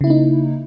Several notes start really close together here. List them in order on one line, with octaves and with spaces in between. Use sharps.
C#3 E4 A#3 D#4